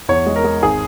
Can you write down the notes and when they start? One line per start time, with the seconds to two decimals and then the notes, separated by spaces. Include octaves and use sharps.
0.08 E2 C#5
0.26 G#3
0.36 A#4
0.44 G#3
0.62 G#1 G#4